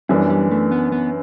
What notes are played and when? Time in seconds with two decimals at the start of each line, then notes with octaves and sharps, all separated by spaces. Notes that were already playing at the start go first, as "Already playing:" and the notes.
0.09 F#2 E3 G3 B3 D4
0.30 G3
0.51 A3
0.71 B3
0.92 B3